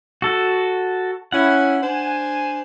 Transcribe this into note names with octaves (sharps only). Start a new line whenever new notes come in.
F#4 A4
C#4 E4 F#5
D4 C5 G#5